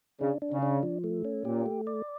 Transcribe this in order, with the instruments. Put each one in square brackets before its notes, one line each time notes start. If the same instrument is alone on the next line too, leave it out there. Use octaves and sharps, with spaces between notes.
[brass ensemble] C#3 [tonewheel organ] D4
[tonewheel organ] D4
[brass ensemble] C#3
[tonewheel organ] D4
F3
A3
C#4
[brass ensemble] A#2 [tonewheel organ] G4
[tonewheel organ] A3
D5